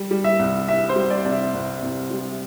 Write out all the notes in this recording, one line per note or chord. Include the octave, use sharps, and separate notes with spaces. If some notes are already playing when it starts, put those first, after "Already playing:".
Already playing: G3
G3
E5
C2
C3 E5
C5
G3
D5
C3 D5
E5
C2
C2
G3